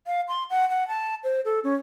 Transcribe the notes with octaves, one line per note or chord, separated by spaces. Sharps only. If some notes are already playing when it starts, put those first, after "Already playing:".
F5
C6
F#5
F#5
A5
C5
A4
C#4